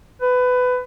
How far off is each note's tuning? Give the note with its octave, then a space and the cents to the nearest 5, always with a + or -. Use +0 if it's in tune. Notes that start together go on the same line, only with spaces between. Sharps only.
B4 +20